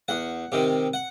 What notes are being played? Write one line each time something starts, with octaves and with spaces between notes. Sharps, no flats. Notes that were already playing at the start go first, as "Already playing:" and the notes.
E2 F#5
C3 D#3
F#5